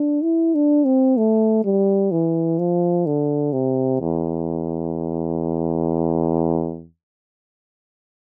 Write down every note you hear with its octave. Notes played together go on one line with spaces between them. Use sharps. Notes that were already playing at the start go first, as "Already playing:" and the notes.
Already playing: D4
E4
D4
C4
A3
G3
E3
F3
D3
C3
E2